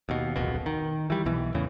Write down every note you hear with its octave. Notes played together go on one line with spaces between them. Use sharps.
D#2 B2
D1 A#1 F2 B2
D#3
E3 G3
B1 B2 E3
E2 A2 C#3 E3